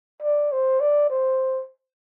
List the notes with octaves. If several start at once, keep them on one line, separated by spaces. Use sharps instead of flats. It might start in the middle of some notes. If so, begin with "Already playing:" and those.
D5
C5
D5
C5